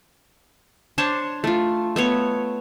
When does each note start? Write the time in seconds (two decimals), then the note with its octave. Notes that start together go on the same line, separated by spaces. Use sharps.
0.98 D4 C5 C#5 A5
1.44 A3 F4
1.96 A3 B3 C#5